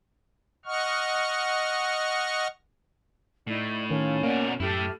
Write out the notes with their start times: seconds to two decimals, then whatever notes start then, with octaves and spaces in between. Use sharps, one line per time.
0.65 D#5 F#5 C#6 F6
3.47 A2 D#4 E4 D5
3.91 D#3 C#4 F4 A4
4.23 B2 A#3 A#4 D5 F#5 A#5
4.60 F#2 A3 E4 G4 A4 F6